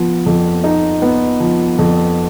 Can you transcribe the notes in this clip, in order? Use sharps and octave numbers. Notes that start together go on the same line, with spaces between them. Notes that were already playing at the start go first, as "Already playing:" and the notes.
Already playing: F3 B3
F2
D#4
B3
F3
F2